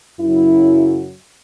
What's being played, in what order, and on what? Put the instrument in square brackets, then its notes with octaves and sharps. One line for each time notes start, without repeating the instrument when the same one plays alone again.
[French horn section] F#2 C#3 F#3 E4